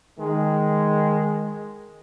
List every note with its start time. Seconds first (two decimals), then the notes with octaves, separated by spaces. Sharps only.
0.19 D#3 G#3